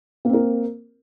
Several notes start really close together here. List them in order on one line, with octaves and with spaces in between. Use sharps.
A#3 C4 A#4